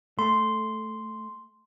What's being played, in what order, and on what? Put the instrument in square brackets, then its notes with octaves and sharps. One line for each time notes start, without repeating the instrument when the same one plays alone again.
[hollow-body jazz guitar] A3 [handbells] C6